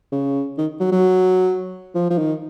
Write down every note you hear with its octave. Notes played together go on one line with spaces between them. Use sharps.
C#3
D#3
F#3
F#3
F3
F3
D#3